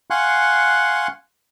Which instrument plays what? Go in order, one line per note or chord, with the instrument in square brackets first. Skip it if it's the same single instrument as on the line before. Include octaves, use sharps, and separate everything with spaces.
[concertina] F5 F#5 G#5 C6 C#6 F#6